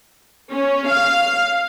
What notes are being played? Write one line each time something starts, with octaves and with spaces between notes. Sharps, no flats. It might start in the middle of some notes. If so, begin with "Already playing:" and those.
C#4
F5